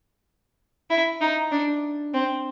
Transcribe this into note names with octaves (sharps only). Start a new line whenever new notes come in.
E4
D#4
D4
C4